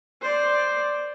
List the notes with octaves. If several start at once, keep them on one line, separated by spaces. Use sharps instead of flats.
C5 D5